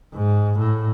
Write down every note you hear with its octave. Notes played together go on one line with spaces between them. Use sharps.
G#2
A2